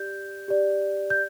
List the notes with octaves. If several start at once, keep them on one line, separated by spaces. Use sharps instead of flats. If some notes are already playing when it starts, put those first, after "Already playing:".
Already playing: G4 D5 G6
G4 D5
G6